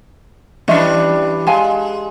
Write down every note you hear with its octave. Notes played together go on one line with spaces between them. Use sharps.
E3 G3 C#4 D4 D#5 E5
G#3 F5 G#5 A5